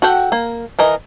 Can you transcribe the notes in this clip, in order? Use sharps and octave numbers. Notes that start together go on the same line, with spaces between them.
F#4 A4 F#5 G5
A#3
E3 A#4 D#5